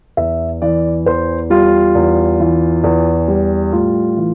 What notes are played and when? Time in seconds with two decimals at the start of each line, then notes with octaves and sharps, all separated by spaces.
0.17 E2 E5
0.62 E3 D5
1.06 E2 C5
1.50 G3 F4
1.95 E2
2.40 E3
2.84 E2
3.28 G3
3.72 A2 F4
4.17 E3